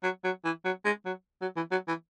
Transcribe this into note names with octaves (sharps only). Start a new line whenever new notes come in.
F#3
F#3
E3
F#3
G#3
F#3
F#3
E3
F#3
E3